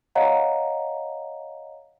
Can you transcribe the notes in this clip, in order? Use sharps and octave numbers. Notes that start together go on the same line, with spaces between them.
C#5 D#5 F5 F#5 A#5